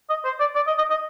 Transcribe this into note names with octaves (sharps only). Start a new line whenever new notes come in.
D#5
C5
D5
D5
D#5
D#5
D#5